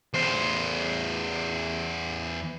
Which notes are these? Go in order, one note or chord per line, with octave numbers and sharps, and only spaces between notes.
E2 C5